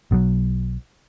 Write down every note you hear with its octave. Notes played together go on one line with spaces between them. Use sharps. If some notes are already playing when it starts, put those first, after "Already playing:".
B1 B2 D#3 F#3